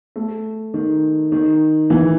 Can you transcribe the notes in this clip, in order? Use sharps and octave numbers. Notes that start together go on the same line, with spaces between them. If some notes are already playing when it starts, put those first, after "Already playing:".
A3
D#3
D#3
E3